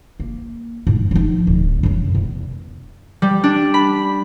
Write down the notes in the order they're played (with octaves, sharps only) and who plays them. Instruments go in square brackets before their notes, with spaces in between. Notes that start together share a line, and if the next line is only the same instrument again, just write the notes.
[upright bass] A#3
G#2
F3 D#4
D1
F#2 C3
E2
[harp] G3
D4
B5